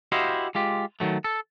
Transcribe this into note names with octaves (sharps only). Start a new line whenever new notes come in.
E4 F#4 G4 C5 D#5 F5
G#3 F4 G4
D#3 F#3 A3
A4